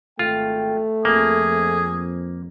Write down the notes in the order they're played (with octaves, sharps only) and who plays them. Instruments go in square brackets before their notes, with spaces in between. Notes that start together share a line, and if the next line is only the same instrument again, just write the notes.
[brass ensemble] G#1 G5 [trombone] A3 [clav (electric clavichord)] F4
[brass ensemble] F2 [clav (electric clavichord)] A#3 [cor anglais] G#4